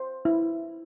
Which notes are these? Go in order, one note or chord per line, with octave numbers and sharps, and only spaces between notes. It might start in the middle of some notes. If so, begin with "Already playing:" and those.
Already playing: C5
E4